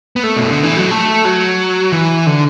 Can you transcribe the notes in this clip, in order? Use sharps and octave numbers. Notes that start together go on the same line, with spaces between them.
B3
A3
B2
D3
E3
F#3
A3
F#3
E3
D3